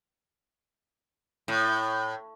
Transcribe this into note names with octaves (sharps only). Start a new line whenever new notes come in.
A2